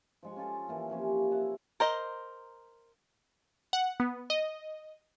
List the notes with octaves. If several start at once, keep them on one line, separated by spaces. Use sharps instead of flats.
F3 G#3 C#6
C#4 F4 A4 D6
E3 A#3 C#4
C3 F3 C#4 G4
E4 F#5 A5
A#4 C5 D#5
F#5
B3
D#5